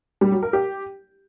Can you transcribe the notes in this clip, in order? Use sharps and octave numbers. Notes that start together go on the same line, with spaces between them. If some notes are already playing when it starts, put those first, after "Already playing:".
G3
F#3
A#4
G4